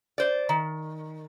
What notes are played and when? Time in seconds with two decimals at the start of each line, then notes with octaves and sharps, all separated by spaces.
0.18 C5 D5
0.49 D#3